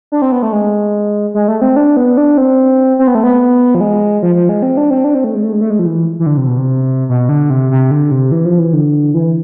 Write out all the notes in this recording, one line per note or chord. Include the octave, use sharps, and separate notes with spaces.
D4
C4
B3
A3
G#3
G#3
A3
C4
D4
B3
D4
C4
C4
B3
A3
B3
F3
G#3
F3
F3
G#3
C4
D4
C4
D4
C4
A3
G#3
A3
G#3
A3
G#3
F3
E3
E3
D3
C3
B2
C3
B2
D3
C3
C3
D3
C3
E3
F3
E3
D3
E3